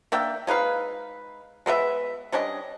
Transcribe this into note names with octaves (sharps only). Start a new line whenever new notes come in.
A#3 D4 E5 G5
G#3 D#4 B4 F5
G#3 B3 A4 E5
G3 C#4 D4 D#5